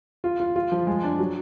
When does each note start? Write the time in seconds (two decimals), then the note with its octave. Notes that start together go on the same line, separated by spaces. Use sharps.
0.24 F4
0.40 F4
0.56 F4
0.72 F3
0.87 G#3
1.03 D4
1.19 F#3